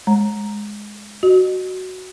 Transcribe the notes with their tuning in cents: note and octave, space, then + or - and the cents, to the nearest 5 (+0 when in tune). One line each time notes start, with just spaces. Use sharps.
G#3 +0 C#5 -30 A#5 +0
F#4 +5 D#5 -35